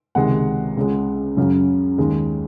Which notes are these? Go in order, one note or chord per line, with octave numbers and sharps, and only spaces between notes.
C#2 C3 D#3 G#3 F#5
C#2 C#3 G#3
F#2 C#3 F#3
D#2 D#3 G#3